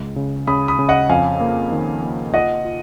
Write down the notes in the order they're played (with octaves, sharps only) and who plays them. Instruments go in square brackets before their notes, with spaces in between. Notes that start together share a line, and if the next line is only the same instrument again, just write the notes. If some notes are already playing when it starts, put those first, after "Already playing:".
Already playing: [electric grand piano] C#2 G#3
C#3
[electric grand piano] C#3 [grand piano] B5 D#6
[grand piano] B5 D#6
[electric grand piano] C#3
[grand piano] D#5 F#5
[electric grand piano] F2 [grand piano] F5 G#5
[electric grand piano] A#3
D#3
A#3
[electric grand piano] F4 [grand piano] D#5 F#5
[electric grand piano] F4